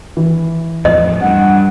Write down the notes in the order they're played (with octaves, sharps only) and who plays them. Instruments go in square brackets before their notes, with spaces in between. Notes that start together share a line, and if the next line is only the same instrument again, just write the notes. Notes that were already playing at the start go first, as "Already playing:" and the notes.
[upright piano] E3
[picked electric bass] E2 A2 F3 [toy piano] D#5
[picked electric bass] G2 [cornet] F#5